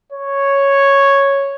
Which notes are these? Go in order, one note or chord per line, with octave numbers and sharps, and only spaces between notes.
C#5